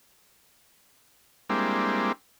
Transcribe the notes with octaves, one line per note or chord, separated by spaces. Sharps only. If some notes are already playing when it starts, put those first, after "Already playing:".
G3 G#3 A#3 C4 D4 E4